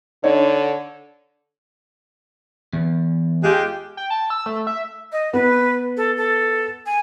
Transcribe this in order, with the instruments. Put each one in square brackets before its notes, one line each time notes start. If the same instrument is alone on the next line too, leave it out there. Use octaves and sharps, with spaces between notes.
[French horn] D3 [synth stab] D4 D#4 [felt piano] C#5
[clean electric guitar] E2
[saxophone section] G#3 F4 G4
[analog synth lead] G5
A5
E6
A3
E5
[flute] D#5
[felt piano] B3 [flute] B4
[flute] A4
A4
G#5